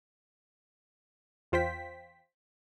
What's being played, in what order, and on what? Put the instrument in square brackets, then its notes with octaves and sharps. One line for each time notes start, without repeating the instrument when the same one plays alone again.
[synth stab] E2 F4 C5 G5 B6